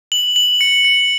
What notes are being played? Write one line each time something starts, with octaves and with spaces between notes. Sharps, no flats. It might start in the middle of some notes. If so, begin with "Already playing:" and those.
F#7
F#7
C#7
C#7